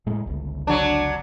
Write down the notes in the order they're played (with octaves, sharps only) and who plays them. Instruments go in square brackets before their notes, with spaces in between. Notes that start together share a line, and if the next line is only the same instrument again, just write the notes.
[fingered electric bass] A2 G#3
G1 C#2
[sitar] F#3 D4